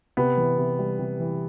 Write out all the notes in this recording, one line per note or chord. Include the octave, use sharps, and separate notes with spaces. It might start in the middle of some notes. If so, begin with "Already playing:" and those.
C3 B3
E3
C3
G3
C3
E3